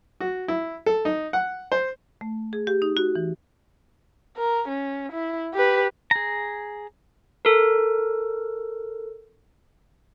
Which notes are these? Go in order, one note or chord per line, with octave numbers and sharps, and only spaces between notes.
F#4
E4
A4
D#4
F#5
C5
A3
G#4
G4
D#4
F#4
E3
A#4
C#4
E4
G4 B4
G#4 A#5
A4 A#4